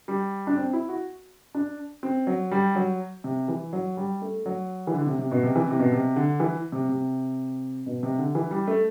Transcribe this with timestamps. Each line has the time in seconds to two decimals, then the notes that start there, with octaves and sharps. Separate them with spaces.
0.08 G3
0.47 D4
0.57 C4
0.73 E4
0.89 F#4
1.55 D4
2.03 C4
2.27 F#3
2.51 G3
2.75 F#3
3.24 C3
3.48 E3
3.73 F#3
3.97 G3
4.22 A3
4.46 F#3
4.87 E3
4.94 D3
5.06 C3
5.19 C3
5.31 B2
5.43 C3
5.56 E3
5.68 C3
5.79 B2
5.92 C3
6.16 D3
6.40 E3
6.72 C3
6.89 C3
7.86 B2
8.03 C3
8.19 D3
8.35 E3
8.51 G3
8.67 A3